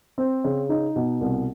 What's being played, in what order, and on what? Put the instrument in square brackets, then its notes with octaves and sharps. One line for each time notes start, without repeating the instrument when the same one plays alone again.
[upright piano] C4
C#3
D#4
B2
C2